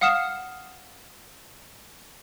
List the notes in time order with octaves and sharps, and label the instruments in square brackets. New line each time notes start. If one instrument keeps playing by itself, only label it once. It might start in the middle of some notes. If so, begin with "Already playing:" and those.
[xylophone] F5 F#5 D#6 F6 C7 E7